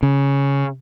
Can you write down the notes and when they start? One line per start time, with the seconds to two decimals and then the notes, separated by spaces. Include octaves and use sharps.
0.03 C#3